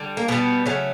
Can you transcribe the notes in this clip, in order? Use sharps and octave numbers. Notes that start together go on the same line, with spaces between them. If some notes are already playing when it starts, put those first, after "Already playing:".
Already playing: D3 G3
A#3
B2 G3 B3
C#3 F#3 A3